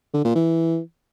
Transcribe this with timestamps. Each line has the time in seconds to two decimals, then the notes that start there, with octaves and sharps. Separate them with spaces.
0.14 D3
0.24 A#2
0.35 E3